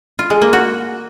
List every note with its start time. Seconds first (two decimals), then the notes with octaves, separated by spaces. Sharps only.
0.19 F4
0.30 G#3
0.42 A#3
0.53 F#4